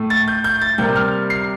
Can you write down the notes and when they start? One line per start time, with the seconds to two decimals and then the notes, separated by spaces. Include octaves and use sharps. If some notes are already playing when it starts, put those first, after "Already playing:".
Already playing: A2 A3
0.10 A6
0.28 G6
0.44 G6
0.62 A6
0.78 C3 G3 A#3 G6
0.96 F6
1.30 C7